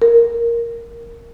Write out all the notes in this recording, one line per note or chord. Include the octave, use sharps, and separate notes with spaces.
A#4